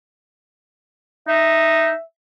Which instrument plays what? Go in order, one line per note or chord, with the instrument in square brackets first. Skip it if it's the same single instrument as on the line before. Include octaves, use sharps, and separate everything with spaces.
[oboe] D#4 [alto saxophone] E5